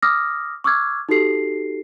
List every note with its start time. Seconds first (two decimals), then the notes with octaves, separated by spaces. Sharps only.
0.03 D6 D#6 F6 A#6
0.64 C#6 D6 E6 F6 G#6
1.09 D#4 F#4 G4 A4 C7